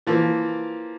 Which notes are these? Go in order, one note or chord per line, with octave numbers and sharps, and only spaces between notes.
E3 F3 A#3